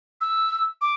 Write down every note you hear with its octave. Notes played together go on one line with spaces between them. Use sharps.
E6
D6